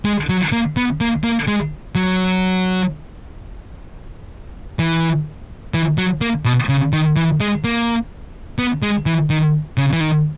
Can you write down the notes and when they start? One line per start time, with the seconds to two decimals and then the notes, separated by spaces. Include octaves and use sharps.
0.05 G#3
0.29 F#3
0.52 A#3
0.77 B3
1.01 A#3
1.24 A#3
1.48 G#3
1.95 F#3
4.79 E3
5.74 E3
5.98 F#3
6.21 A#3
6.45 B2
6.69 C#3
6.93 D#3
7.16 E3
7.40 G#3
7.64 A#3
8.59 B3
8.82 G#3
9.06 E3
9.30 D#3
9.78 C#3
9.93 E3
10.01 D#3